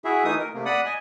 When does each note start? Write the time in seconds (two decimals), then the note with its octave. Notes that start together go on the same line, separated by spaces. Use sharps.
0.05 E4 F#4 G#4 E5
0.25 E3 A3 D#4 D#6
0.40 A#4
0.54 C3 A3 A#3
0.65 D5 F#5 B5 D#6
0.86 D#5 G#5